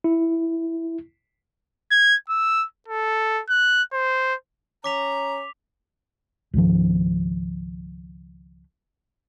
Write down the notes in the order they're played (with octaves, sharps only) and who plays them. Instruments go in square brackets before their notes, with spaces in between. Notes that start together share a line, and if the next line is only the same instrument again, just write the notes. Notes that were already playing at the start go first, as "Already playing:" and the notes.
[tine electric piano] E4
[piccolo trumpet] G#6
E6
A4
F#6
C5
[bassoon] C#4 [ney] A#5 [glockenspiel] D6 B6 F7
[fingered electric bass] C#2 G#2 D#3 F3